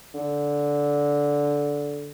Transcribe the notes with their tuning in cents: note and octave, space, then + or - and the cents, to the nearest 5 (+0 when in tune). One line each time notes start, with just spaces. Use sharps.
D3 -15